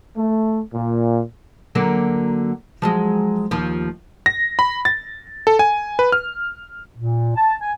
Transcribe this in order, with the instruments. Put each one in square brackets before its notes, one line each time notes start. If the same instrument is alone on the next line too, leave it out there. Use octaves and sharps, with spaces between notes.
[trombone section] A3
A#2
[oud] D3 F#3 A#3
F3 F#3 G#3
D#2 F3
[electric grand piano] A#6
B5
A6
A4
G#5
B4
F6
[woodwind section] A#2
A5
G#5